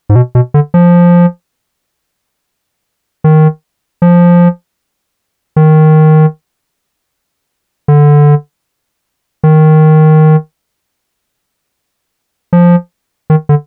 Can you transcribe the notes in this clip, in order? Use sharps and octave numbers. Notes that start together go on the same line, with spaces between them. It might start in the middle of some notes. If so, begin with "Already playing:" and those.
G#2
B2
B2
D3
F3
D#3
F3
D#3
D3
D#3
F3
D#3
D3